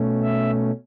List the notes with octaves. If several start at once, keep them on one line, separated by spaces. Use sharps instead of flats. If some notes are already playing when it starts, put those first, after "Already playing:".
Already playing: B2 A3 C#4
E5